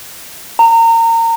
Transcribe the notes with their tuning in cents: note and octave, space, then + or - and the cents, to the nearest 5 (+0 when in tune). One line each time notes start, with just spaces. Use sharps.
A#5 -30